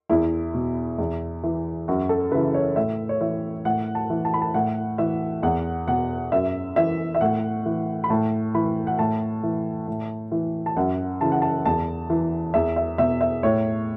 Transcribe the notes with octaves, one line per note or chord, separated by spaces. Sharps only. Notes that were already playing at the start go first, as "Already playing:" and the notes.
E2 E4
B2
E2
E3
F#2 F#4
A4
C#3 E3 B4
C#5
A2 E5
C#5
E3 E5
A2 F#5
A5
E3
A5
B5
A5
A2 F#5
E3 E5
E2 F#5
B2 F#5
F#2 E5
E3 E5
E5
A2 F#5
E3
B5
A2 A5
E3 B5
F#5
A2 A5
E3
A2
E3
A5
F#2 F#5
C#3 E3 A5
F#5
A5
E2 A5
E3
E2 E5
E5
B2 E5
E5
A2 C#5